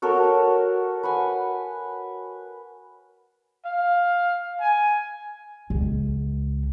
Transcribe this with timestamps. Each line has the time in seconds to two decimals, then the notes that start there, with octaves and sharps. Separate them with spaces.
0.02 F#4 A4 A#4 C#5
1.03 B4 F#5 G#5
3.66 F5
4.60 G#5
5.70 C#2